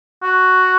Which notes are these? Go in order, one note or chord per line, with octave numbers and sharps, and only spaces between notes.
F#4